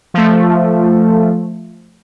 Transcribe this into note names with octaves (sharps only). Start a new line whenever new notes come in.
F3 A3